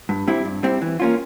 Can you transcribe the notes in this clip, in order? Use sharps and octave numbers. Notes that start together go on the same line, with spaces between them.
G2
G3 C4 E4
G2
G3 C4 E4
E3
A#3 C#4 F4